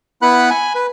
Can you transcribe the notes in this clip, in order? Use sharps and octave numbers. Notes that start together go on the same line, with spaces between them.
B3 E4 B4 F#5 B5 F#6
G#5 B5
B4